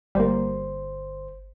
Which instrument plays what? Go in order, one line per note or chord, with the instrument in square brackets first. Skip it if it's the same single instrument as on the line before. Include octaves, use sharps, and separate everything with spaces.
[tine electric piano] G1 C5 [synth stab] G3 A#3